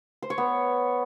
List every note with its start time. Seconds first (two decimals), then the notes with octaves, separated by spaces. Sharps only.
0.22 C5
0.30 C#5
0.38 B3